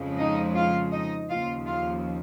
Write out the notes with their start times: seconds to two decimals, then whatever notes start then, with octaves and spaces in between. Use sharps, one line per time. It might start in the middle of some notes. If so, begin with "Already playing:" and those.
Already playing: F2 C#3 F3 G#3
0.17 D#4 D#5
0.55 F4 F5
0.92 D#4 D#5
1.29 D#2 C#3 F3 F4 F5
1.67 F4 F5